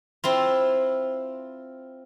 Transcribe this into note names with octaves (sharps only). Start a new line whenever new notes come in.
C4 E4 F4